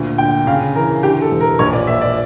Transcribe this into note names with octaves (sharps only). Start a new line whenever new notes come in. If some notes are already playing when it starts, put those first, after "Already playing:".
Already playing: D2 A#2
D3 G5
C#3 F5
E3 A#4
D3 G4
A4
E1
A#4
A#1 C#5
D5
A#2 E5
D5